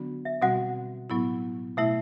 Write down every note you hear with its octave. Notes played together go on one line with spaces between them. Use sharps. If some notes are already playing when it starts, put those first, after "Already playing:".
Already playing: D3 F#3 B3 D4 F#4
E5
B2 G3 C4 F#4 F#5
A2 F#3 B3 E4
B2 A3 E4 E5